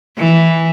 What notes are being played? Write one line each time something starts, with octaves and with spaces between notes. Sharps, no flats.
E3